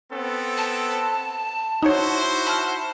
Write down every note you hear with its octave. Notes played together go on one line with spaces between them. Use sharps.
B3 C4 A4
A5
D#4 E4 F#4 C5 C#5
A5 B5 F6